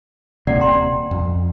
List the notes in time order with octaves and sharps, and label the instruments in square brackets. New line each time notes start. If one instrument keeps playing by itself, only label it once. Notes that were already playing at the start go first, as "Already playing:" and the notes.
[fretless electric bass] D#1 C3 A#3 [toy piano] D5 F#5
[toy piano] G5 A#5 C6
[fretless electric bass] F2